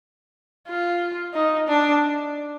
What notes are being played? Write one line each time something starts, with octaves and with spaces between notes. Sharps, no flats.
F4
D#4
D4